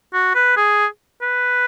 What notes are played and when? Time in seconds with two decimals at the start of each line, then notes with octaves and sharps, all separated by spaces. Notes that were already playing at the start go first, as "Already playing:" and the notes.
0.13 F#4
0.35 B4
0.57 G#4
1.22 B4